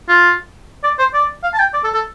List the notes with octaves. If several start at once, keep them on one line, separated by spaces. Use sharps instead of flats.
F4
D5
C5
D5
F5
A5
G5
D5
A4
A4